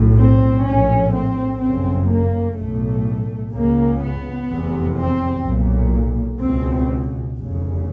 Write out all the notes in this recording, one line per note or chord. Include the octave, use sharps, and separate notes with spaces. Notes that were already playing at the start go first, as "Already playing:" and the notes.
Already playing: B1 A2
C4
A#1 A2 C#4
C4
G1 F#2 C#3 C4
A#3
B1 A2 A3
C#2 C#3 A#3
B3
F1 E2 C3
C4
B1 A#2
C#2 B2 C4
F1 E2 C#3